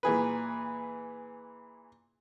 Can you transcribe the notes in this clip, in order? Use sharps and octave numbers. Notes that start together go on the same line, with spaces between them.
A#2 E3 G#4 B4